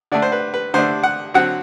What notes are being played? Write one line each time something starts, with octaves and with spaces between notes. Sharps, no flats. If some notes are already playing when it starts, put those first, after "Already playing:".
D3 A3 D4 D5
C5
B4
B4
D3 A3 D4 C5
F#5
D3 F#3 C4 F#5